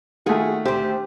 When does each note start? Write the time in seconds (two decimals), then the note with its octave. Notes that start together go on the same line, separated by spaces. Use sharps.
0.26 D#3 A3 F4 F#4 G#4
0.65 D2 C4 G4 C5